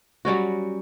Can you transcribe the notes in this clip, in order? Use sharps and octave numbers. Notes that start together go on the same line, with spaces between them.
F#3 G3 C#4 F#4